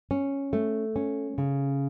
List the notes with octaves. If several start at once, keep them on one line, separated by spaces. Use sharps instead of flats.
C#4
A3
C#4
C#3